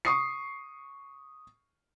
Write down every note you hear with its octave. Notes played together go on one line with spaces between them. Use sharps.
C#6 D#6 C7